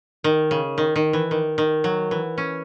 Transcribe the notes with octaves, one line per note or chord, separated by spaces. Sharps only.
D#3
C#3
D#3
D#3
E3
D#3
D#3
F#3
E3
C#4